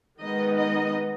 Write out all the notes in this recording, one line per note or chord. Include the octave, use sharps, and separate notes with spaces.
D#3 G#3 B3 D#4 D#5
D#5